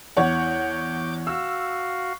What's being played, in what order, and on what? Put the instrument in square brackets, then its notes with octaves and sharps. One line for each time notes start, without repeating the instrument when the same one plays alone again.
[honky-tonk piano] E2 C#5 F#5 [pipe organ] D6 G6
[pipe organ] F#4 F5 [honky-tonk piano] E6